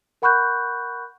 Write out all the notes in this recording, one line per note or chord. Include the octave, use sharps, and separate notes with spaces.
A#4 F#5 B5 C#6 F#6 G6